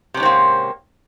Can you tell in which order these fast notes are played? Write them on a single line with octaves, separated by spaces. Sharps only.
C3 C#4 G#2 C4 A#3